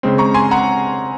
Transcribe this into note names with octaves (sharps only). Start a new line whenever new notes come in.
C#3 G#3 C4
A#5 C#6
G#5 C6
F#5 A#5